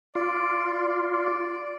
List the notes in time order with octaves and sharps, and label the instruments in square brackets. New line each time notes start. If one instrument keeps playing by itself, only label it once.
[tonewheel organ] F4 [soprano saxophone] D5
[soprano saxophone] D5